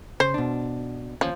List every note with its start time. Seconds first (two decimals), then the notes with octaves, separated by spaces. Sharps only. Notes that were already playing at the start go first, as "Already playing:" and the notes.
0.20 C#3 C5
0.34 B2 D4
1.21 D#2 F3 C#4